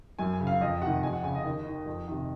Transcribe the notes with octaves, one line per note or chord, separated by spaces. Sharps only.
F#2 G#5
G#5
C#3
F5
F2 D#5
C3 D#3 F#5
F2 G#5
F#5
C#3 G#5
D#5
D#2
D#3
F2
C3 D#3